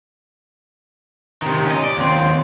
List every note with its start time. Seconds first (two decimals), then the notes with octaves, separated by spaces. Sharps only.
1.42 C3 D#3
1.66 C#4 D#5
1.84 D5
1.97 D#2 C4